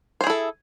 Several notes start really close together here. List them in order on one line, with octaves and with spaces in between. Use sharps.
C5 G#4 E4 A4